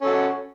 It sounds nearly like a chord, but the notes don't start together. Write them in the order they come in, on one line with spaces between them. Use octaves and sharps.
C#4 A4 F#4